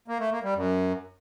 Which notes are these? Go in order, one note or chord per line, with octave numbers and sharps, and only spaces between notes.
A#3
A3
A#3
G3
F#2